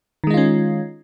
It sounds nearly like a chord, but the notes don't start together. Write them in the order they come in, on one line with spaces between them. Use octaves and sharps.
D#3 G#3 D#4 F4 C#4